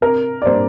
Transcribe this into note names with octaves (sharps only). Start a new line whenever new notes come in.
C3 A#4
D5
G3 A#3 D4 C5